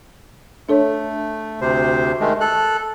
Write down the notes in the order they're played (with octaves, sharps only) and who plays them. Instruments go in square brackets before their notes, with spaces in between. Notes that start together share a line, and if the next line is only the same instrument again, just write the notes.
[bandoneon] A3 [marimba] D4 A4 C#5
[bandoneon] D2 C3 C5
D#3 G#3 A3
A4 F#6